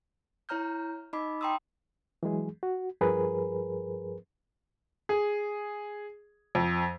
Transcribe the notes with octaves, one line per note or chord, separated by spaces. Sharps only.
E4 C#5 A#5 F6 G6
D#4 D#5 B5 D6
G5 A#5 C6 D#6 E6
E3 F#3 G#3 G#4
F#4
G2 F3 G#4 A#4 B4
G#4
F2